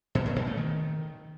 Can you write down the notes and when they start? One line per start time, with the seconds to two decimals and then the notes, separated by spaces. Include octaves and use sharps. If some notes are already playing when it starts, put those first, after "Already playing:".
0.15 B2
0.26 A#2
0.36 B2
0.47 A3
0.57 D#3